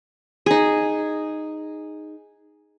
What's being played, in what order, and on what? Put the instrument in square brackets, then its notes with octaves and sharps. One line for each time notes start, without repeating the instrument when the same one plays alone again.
[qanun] D#4 G#4